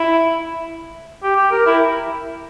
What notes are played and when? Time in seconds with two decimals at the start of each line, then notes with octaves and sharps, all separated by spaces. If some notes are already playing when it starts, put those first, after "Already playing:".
Already playing: E4
1.23 G4
1.37 G4
1.51 A#4
1.66 E4